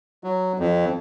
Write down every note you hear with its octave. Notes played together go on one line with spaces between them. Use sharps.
F#3
F2